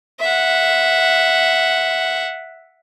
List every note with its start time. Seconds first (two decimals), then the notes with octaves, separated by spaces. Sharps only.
0.20 E5 F#5